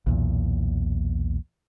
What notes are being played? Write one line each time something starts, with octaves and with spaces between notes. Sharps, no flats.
B1 E2 A#2